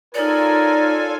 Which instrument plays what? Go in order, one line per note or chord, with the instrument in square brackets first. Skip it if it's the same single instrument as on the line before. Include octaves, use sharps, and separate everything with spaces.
[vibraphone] D#4 C#5 [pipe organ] F4 A4 G#5 [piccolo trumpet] A#4 [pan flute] D5